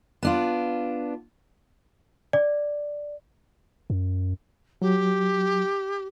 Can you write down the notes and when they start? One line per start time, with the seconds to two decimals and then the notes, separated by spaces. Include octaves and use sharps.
0.23 B3 D4 F4
2.33 D5
3.90 F#2
4.82 F#3 G4